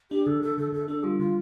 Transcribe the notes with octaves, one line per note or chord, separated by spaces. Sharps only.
D4 G4
D3 A4
D3 A4
D3 A4
D3 A4
D4 A4
G3 F4
D3 F4